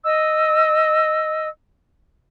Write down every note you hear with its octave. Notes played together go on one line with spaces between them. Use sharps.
D#5 E6